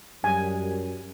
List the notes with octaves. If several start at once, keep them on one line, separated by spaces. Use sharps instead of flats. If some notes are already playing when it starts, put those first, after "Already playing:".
F#2 G3 G#5